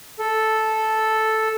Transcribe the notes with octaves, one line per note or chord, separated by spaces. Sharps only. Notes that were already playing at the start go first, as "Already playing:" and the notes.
A4